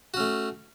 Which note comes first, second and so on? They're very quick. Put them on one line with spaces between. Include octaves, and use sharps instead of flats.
F#4 C#4 A3